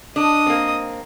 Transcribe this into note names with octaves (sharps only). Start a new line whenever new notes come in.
D4 D#5 D#6
A#3 C4